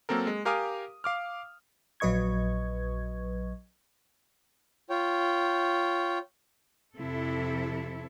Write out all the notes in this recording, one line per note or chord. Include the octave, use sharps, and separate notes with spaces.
F#3 A#3 C4 A4 A#4
G#3
G4 A#4 F5 G#5 D6 D#6
F5 D6 F6
A#1 F#3 B4 D#5 C#6 G#6
F4 C#5 G5
F2 C3 E4 A4